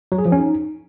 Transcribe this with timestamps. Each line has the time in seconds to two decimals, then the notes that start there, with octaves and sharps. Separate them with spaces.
0.12 F#3
0.19 G#4
0.25 F3
0.32 C#4
0.39 D#4